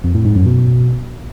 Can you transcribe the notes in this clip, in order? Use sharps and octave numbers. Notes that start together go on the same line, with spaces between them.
F2
A2
G#2
F#2
B2